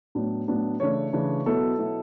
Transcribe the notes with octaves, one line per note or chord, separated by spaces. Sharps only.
A2 F#3 B3 D4
A2 F#3 B3 D4
C#3 E3 A3 D4 C#5
C#3 E3 A3 D4
B2 F#3 B3 E4 A4
B2 F#3 B3 E4